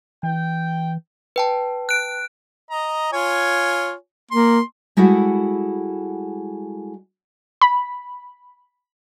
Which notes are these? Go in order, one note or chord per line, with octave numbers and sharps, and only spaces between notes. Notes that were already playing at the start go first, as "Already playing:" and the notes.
E3 G5
B4 G5 A5
F#6 D7
D#5 A#5
F4 C#5 G#5
A#3 C6
G3 G#3 E4 F#4 A4 F#5
B5